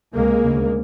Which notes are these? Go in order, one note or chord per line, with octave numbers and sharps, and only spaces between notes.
C#2 C3 G#3 A#3
D2 C#3